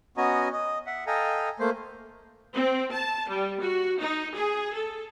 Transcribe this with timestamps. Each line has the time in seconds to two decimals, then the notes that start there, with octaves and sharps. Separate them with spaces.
0.17 B3 C#4 F#4 D#5 G#5 A#5
0.52 D#5
0.86 E5 F#5
1.07 A4 D#5 F5 G5 G#5 A#5
1.60 A3 A#3 C5
2.54 C4
2.91 A5
3.27 G3
3.60 F#4
3.99 D#4
4.34 G#4
4.75 A4